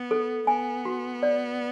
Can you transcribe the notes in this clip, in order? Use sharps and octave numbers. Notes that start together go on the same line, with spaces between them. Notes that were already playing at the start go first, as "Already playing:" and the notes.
Already playing: B3
A4
B3 G#5
F#4
D5